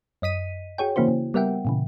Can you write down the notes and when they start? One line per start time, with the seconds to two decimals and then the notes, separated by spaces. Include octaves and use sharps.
0.22 F#2 D#5 B6 D#7
0.78 F#4 G#4 C#5 G5
0.96 C#3 E3 A#3 E4 F#4 C5
1.08 C#3
1.34 G3 B3 A#4 E5 F#5 G5
1.65 A#2 C#3 E3